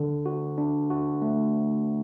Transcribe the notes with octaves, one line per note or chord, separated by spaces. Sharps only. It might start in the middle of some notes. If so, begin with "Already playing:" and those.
Already playing: D3
F#4
D4
F#4
A3